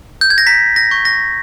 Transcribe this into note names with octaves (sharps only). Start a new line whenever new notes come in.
G6
G#6
A#6
A#5 B6
A#6
C#6 G6
A#6